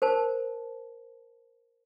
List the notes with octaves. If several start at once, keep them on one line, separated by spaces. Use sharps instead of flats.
A#4 C5 A5